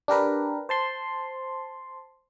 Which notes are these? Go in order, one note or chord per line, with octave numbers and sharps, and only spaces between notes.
D4 G4 A#4 B4
C5 A5 C6